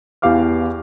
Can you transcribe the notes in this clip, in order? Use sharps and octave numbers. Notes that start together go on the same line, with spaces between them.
E2 E3 G4 F5 D6 F6